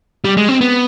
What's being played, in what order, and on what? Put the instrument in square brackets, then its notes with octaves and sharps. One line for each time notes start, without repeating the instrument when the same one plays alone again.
[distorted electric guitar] G3
G#3
C4
B3